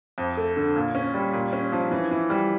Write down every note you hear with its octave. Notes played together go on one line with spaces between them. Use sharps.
F2
A3
D3
A#2
C#4
G3
A#2
C#4
F3
E3
E3
G3